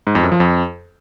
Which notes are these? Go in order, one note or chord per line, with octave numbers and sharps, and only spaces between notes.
G#2
F2
F#2
F3
F2